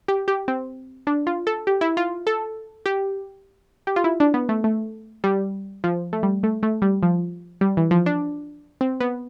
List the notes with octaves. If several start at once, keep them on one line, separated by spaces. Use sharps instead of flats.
G4
G4
C4
D4
F4
A4
G4
E4
F4
A4
G4
G4
F4
E4
D4
B3
A3
A3
G3
F3
A3
G3
A3
A3
G3
F3
G3
E3
F3
D4
C4
B3